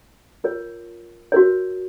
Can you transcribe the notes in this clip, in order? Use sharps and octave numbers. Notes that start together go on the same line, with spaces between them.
F4 A#4 C#5
F#4 A#4 C#5